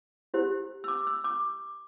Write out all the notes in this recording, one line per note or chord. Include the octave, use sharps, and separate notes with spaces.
E4 G4 C5
E6
D6
E6
D6